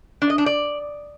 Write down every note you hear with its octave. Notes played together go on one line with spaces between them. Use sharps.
D4
D#5
D4
D5